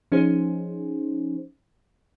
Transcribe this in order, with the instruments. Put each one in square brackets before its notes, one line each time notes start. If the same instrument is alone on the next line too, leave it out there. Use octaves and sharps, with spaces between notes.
[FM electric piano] F3 C#4 D#4 G#4 C5